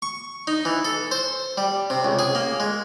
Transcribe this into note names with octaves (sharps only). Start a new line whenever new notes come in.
C#6
D#4
E3
A4
C5
G3
C3
C#2
G#4
A#3
G#3